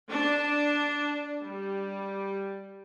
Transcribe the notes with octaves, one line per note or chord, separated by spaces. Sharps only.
D4
G3